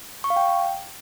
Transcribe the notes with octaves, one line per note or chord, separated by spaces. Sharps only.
C#6
F5
G5